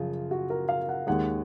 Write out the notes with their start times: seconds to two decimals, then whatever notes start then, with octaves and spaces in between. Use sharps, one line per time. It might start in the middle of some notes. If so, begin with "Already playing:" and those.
Already playing: F#2 C#3 F3 F4
0.31 F#4
0.50 A#4
0.69 F5
0.89 F#5
1.07 D#2 D#3 G#3 F#5